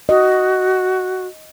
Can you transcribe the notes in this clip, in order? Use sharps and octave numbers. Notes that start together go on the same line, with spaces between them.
F#4 D#5